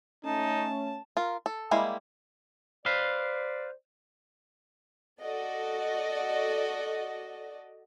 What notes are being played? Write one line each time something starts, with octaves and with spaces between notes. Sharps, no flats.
A3 C#4 D#4 A5
F4 A#4
A4
G3 G#3 A#3 E4
B4 C5 D5 F5
F#4 A4 D5 D#5